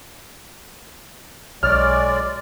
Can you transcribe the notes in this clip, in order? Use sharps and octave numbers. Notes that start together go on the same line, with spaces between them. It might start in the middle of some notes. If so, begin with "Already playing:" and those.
B1 G#3 C#5 D5 F6